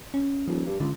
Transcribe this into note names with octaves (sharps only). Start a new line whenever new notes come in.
C#4
D#1 F3
G2
C#2 D3